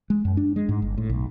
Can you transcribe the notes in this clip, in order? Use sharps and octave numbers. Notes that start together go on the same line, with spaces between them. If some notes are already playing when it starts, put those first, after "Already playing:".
G#3
F#2
D4
G#3
G#2
G1
A2
B1